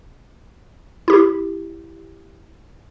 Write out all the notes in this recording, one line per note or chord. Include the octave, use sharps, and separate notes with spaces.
E4 G4